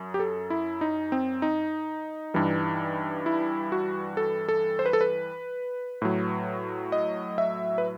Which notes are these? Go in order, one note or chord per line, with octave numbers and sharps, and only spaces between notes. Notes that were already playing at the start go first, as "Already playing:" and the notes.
Already playing: F#2
G4
A4
E4
D#4
C4
D#4
G2 E3 G3
E4
F#4
A4
A4
C5
B4
A4
B4
A2 F#3
D#5
E5
B4